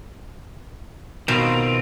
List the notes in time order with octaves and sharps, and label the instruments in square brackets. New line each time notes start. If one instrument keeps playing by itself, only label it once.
[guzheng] B2 [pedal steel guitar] D#3 C4 F4